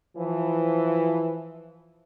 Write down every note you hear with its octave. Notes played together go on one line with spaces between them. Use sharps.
E3 F3